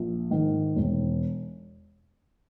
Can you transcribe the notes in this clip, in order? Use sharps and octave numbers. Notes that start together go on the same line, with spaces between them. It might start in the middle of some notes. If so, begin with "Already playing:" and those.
Already playing: A#1
G#2 D#3
E1